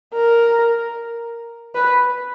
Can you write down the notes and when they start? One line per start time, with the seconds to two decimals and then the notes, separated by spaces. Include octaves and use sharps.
0.14 A#4
1.75 B4